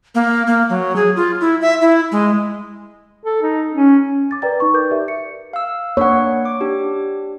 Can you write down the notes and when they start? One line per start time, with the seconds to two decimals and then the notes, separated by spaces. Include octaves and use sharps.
0.15 A#3
0.47 A#3
0.69 F#3
0.96 G#4
1.16 F4
1.41 E4
1.61 E5
1.82 E4
2.12 G#3
3.24 A4
3.43 D#4
3.73 C#4
4.31 D6 A6
4.42 A#4 B4 D5 G5 A#5 A6
4.60 D#4 C#6
4.74 A#4 B4 D6 G6
4.91 G4 A#4 D5 E5
5.08 C#7
5.53 F5 E6
5.97 A#3 D4 C#5 F#5
6.45 D6
6.61 D4 G4